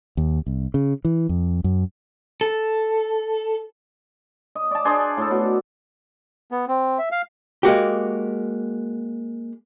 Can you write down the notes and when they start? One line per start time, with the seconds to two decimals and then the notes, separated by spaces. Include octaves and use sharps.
0.17 D#2
0.47 C2
0.74 C#3
1.05 E3
1.29 F2
1.64 F#2
2.41 A4
4.55 D#5
4.71 D5 A5
4.85 D4 G#4 C5 D5
5.17 A2 A4
5.31 B2
6.51 B3
6.68 C4
6.99 E5
7.12 F5
7.63 G#3 A#3 F#4 G4